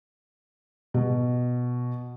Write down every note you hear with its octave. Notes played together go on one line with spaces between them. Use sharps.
B2